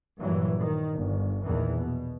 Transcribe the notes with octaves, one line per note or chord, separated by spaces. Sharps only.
G2 A#2 E3 F#3
D#3
G1
A#1 E2 D#3 E3
B2